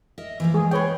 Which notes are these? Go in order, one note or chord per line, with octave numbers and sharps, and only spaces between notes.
A#4 D#5 E5
E3 F3 A#3
G#3 G#4
A#3 G#4 B4 C#5 G5